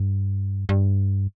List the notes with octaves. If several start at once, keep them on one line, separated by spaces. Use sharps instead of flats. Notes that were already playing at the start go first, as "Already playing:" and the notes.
Already playing: G2
G2